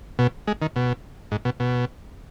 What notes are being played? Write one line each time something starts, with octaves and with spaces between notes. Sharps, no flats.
B2
G#3
D#3
B2
G#2
B2
B2